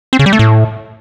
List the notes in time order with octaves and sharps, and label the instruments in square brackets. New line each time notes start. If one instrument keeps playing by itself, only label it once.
[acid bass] C4
C#3
G3
A3
A2